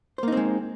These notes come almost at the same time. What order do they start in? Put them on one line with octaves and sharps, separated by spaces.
C5 A#3 D#4 C4 G#3